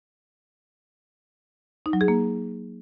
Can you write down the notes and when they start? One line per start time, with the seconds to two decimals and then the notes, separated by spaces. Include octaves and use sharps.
1.86 D#4
1.93 F#3
2.01 G#4
2.08 A#3